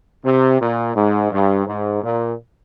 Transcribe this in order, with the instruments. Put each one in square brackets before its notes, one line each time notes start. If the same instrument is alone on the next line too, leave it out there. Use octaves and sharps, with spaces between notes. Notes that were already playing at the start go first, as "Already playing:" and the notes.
[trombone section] C3
A#2
G#2
G2
G#2
A#2